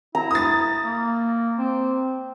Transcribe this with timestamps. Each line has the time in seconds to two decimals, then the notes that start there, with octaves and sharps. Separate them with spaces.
0.15 E4 A#5
0.31 D#6 A6
0.82 A#3
1.58 C4